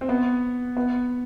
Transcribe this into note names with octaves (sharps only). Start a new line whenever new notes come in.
C4
B3
B3